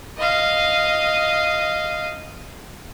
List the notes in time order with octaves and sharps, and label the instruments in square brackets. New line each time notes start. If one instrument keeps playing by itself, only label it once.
[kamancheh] D#5 F5